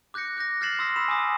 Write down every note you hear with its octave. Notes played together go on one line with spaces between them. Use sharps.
D6 F#6 G6 A#6 C#7
D6 F#6 G6 A#6
F6 G6 A6 C7 E7 F#7
C6 D#6 E6 A#6 B6
B5 C6 E7
G#5 D6 D#6 A#6